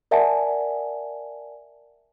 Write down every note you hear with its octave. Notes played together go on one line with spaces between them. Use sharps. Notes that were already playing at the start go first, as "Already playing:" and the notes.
A#4 D5 E5 F#5 G#5 A5